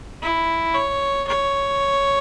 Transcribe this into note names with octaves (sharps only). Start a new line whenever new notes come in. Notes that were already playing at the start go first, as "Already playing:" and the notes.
E4
C#5
C#5